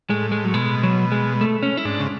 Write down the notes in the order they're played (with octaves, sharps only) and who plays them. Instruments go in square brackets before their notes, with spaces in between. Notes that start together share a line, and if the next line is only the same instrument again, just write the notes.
[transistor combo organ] A2 [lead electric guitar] G#3
[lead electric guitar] G#3
F#3
[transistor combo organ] B2 [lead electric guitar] G#3
[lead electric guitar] F#3
G#3
A3
C#4
E4
[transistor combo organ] G#2 [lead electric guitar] D4
[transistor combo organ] C#3